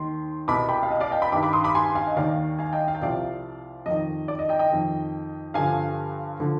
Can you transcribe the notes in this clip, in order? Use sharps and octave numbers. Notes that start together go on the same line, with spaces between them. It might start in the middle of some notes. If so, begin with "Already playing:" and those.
Already playing: D#2 D#3 C6
C2 B2 B5 D6
G5 B5
F5
D#5
D5 F5
D#5 G5
G5 B5
G2 D#3 B5 D6
B5 D6
C6 D#6
B5 D6
G#5 C6
F5 G#5
D#5
D#2 D#3 D5 F5
F5 G#5
D#5 G5
F5
G5
C2 C3 F3 D5 F5
F2 D#3 D#5
D5
D#5
D#5 G5
D#5 G5
F2 D#3
G2 D3 F3 F5 G#5
D3 F3